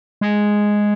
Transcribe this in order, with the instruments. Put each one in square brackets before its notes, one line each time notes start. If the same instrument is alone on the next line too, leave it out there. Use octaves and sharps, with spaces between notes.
[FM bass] G#3